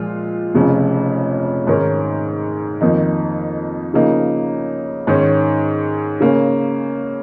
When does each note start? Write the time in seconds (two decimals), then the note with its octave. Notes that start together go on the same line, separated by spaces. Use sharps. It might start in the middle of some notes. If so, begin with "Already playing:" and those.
Already playing: A#2 F3 G#3 F4
0.55 F1 F2 C#3
1.67 G#2 D#3 C#4 A#4
2.81 F2 D#3 A#3 D#4
3.94 C#3 F3 A#3 D#4
5.07 G#2 D#3 C#4
6.20 C#3 A#3 C#4